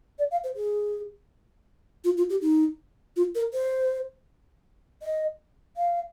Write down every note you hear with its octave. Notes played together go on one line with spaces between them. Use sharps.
D5
F5
C5
G#4
F4
F4
G4
D#4
F4
A#4
C5
D#5
F5